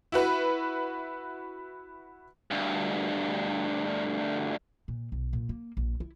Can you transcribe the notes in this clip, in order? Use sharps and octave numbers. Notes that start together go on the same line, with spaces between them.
E4 F#4 B4
D2 G2
A#2
B1
A#2
A#3
A#1
E4